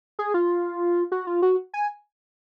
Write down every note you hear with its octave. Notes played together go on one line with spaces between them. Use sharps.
G#4
F4
F#4
F4
F#4
G#5